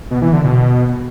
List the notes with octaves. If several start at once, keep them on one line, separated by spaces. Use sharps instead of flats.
B2
E3
D3
B2